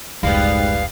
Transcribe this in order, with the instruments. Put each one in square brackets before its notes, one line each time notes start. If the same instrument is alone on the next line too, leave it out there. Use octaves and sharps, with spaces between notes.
[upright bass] F1 C#2 [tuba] G#2 [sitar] G3 B3 [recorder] F5